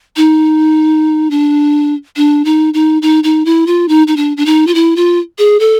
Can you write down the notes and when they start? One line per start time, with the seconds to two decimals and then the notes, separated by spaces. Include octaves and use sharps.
0.17 D#4
1.31 D4
2.16 D4
2.45 D#4
2.74 D#4
3.02 D#4
3.24 D#4
3.45 E4
3.67 F4
3.88 D#4
4.07 D#4
4.17 D4
4.37 D4
4.46 D#4
4.67 F4
4.75 E4
4.96 F4
5.39 G#4
5.60 A4